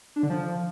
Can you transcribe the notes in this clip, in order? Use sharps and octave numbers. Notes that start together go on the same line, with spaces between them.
D4
D3
F3